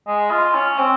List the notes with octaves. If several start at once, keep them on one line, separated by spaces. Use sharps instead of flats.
G#3
F4
C#4
C4